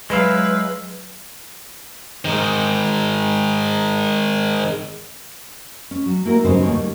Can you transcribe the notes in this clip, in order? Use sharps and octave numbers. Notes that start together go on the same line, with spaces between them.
F#3 G#3 E4 B4 F5
D#3 G#3
C#4
F#3
A#3 E4 F#4 A#4
G2 C#3 F#3 D#4 B4 C5
D2 D#3 A#3 C#5
G3